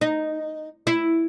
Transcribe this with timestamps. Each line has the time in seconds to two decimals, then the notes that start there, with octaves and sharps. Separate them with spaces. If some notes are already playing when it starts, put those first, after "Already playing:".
0.01 D#4
0.87 E4